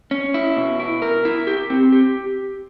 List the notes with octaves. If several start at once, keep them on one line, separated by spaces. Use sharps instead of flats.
C#4
E4
B2
E4
A#4
E4
G4
C4
G4